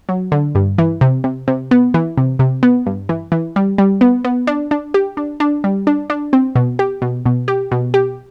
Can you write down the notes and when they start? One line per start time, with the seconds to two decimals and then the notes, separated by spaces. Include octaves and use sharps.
0.09 F#3
0.32 D3
0.55 G2
0.78 E3
1.01 C3
1.24 C3
1.48 C3
1.71 B3
1.94 E3
2.17 C3
2.39 C3
2.63 B3
2.86 G2
3.09 E3
3.32 E3
3.56 G3
3.78 G3
4.01 B3
4.24 B3
4.47 D4
4.71 D4
4.94 G4
5.17 D4
5.40 D4
5.64 G3
5.87 D4
6.10 D4
6.33 C4
6.56 B2
6.79 G4
7.02 B2
7.26 B2
7.48 G4
7.71 B2
7.94 G4